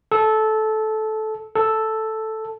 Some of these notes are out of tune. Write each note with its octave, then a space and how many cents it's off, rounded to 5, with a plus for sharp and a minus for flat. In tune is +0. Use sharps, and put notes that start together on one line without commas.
A4 -15
A4 +0